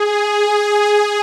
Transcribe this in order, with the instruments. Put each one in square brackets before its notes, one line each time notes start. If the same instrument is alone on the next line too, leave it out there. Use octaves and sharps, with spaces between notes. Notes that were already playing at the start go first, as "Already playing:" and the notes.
Already playing: [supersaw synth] G#4